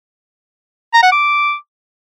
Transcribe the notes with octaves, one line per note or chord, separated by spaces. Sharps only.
A#5
F#5
D6